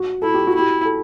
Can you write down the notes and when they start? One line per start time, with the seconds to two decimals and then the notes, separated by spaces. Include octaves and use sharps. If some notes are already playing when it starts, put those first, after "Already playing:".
Already playing: F#4
0.22 E4 A4
0.34 G4
0.47 F#4
0.55 E4 G4
0.85 A4